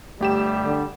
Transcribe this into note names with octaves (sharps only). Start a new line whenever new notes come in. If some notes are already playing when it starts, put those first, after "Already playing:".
G1 G3 A3 G4 E7
D3